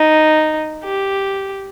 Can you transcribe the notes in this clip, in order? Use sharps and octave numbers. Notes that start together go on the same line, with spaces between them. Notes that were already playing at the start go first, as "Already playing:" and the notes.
Already playing: D#4
G4